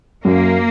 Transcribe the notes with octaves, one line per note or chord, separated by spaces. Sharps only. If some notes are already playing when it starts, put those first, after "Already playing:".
F#2 A#3